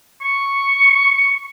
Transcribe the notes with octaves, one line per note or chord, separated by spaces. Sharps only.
C#6